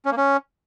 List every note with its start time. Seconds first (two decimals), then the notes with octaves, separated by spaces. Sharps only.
0.05 C#4
0.11 A#3
0.17 C#4